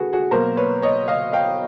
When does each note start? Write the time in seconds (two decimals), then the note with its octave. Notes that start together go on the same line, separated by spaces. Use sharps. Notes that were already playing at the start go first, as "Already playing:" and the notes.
Already playing: D3 F#4 G#4 A4 B4
0.13 F#4 G#4
0.31 B2 F#3 A#3 A#4 C5
0.57 B4 C#5
0.82 C#5 D#5
1.08 D#5 F5
1.33 F5 G5